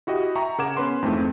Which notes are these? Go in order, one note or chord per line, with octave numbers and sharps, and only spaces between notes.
E4 F#4 G4 D#5
E5 G5 A5 A#5 C#6
C#3 A#4 F#5 D6 G#6 E7
B3 C#4 B4 C6
F2 G#2 E3 A3 C4